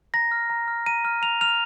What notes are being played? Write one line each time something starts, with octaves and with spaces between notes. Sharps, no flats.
A#5 A#6
F6
A#5
F6
A#5 D#7
F6
A#5 F7
F6 F7